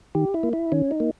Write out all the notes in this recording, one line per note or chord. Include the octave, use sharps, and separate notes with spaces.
D#3 G4
E4
A#3
E4
D#3 C#4
D#4
A#3